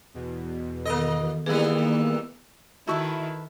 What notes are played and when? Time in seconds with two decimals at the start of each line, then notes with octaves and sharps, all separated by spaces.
0.14 E2 B2
0.86 D#3 A#3 B3 A4 D#5
1.46 D#3 E3 G3 A#3 B3 E4 G#4
2.87 D#3 E4 F#4 A4 B4 E5 C#6